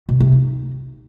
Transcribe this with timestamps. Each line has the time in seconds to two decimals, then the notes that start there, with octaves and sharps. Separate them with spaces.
0.09 B2
0.20 C3
0.32 D#4